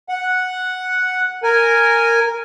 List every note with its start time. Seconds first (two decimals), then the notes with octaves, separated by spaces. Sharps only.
0.09 F#5
1.43 A#4 G#5